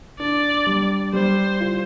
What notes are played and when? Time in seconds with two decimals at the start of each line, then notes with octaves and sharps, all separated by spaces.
0.19 D4 D5
0.67 G3
1.13 G3 C5
1.61 F4